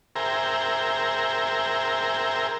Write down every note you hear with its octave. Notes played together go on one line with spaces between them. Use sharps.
G#4 A#4 C5 E5 G5 A#5